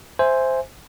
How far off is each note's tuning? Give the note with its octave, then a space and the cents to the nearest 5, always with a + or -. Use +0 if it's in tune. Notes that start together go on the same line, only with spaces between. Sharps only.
C5 +0 E5 +0 G#5 -5